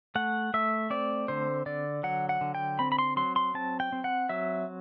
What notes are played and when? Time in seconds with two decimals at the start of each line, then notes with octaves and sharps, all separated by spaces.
0.15 A3 F#5
0.54 A3 E5
0.90 C4 D5
1.28 D3 C5
1.66 D3 D5
2.03 F#3 F#5
2.29 F#5
2.41 D3
2.55 G5
2.79 C4 B5
2.92 B5
2.99 C6
3.16 F#3 C6
3.36 C6
3.55 C4 A5
3.80 G5
3.92 C4
4.04 F#5
4.29 F#3 E5